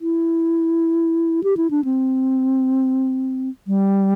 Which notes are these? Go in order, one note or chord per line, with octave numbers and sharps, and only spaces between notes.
E4
G4
E4
D4
C4
G3